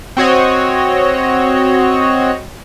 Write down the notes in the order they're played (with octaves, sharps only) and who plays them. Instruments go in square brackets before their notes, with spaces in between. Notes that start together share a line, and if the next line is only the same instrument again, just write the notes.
[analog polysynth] C4 F#4 C#5 D#5